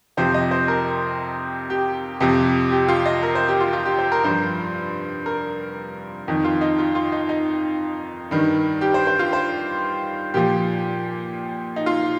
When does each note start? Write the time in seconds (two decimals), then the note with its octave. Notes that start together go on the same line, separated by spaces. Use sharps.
0.17 F2 C3 F3 C5
0.34 D#5
0.51 C5
0.68 A#4
1.70 G4
2.20 F2 C3 F3
2.72 G4
2.88 F4
3.06 D#5
3.23 A#4
3.35 C5
3.48 G4
3.60 F4
3.73 F4
3.86 G4
3.99 C5
4.12 A#4
4.24 G2 F3 C5
5.26 A#4
6.28 F2 D#3
6.44 F4
6.61 D#4
6.78 F4
6.95 F4
7.12 D#4
7.29 D#4
8.31 G2 D#3
8.81 G4
8.94 C5
9.07 C5
9.19 F4
9.33 C5
10.34 A#2 F3 G4
11.76 D#4
11.86 F4